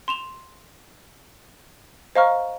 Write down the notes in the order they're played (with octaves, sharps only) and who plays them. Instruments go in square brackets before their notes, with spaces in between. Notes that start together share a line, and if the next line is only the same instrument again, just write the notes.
[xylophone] C6 E7 F7
C5 D#5 F5 A#5 C#6 F6